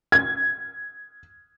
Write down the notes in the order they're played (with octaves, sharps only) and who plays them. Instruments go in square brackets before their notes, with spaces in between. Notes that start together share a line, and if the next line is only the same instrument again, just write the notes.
[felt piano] G#6